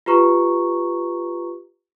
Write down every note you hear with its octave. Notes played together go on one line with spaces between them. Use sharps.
F4 G4 B4 A#5 C#6